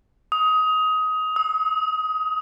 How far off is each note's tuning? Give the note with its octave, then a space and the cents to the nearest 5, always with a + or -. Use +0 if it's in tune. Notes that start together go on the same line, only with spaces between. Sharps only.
D#6 +20
D#6 +45